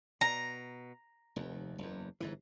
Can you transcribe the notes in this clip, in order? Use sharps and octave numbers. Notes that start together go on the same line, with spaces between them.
B2 A#5
F1 D#2
F#1 E2
G1 G#2 E3